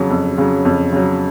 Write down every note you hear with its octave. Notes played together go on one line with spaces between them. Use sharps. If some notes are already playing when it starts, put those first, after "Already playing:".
Already playing: F2 C#3 F#3
F2
C#3 F#3
F2
C#3 F#3